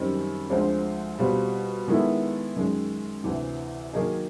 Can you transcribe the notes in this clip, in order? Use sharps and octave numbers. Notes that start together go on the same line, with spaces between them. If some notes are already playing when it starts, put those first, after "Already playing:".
Already playing: F#2 D#3 G3 C4 D#4
D2 D3 F3 G#3 C4
B2 G3 C4 F4
D#3 G#3 B3 E4 A4
F#2 D#3 G#3
D2 C3 E3
D#3 F#3 A#3 D#4 G#4